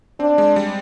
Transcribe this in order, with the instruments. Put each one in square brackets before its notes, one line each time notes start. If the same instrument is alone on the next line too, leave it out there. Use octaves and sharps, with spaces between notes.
[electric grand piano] C4 [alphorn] D4
[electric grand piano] G#3
G3